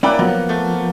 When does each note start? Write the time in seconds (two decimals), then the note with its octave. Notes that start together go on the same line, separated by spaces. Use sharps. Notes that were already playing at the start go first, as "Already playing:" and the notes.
0.03 A#3 C#4 E4 D5 F#5 G5 B5
0.19 F3 F#3 B3
0.49 A3